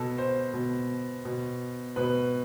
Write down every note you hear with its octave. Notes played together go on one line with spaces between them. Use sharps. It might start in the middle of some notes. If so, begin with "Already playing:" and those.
Already playing: B2 A4
C5
B2
B2
B2 B4